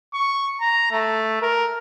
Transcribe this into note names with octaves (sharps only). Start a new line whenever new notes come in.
C#6
A#5
A3
A#4